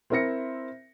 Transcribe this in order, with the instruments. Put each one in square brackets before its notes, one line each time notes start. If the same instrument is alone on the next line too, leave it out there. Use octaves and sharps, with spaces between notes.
[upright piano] C4 E4 A#4 E5 A#6 C#7